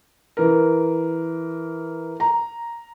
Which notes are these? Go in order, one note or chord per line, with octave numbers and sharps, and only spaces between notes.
E3 A#4
A#5